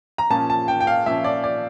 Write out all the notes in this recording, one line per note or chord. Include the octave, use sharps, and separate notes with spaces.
A#5
A#2 F3 C#4 A5
A5
G5
G5
F5
A#2 F3 C#4 E5
D5
D5